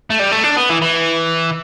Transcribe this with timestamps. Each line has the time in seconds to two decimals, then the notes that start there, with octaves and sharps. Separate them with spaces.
0.10 A3
0.19 G3
0.31 A3
0.43 D4
0.57 B3
0.69 E3
0.82 E3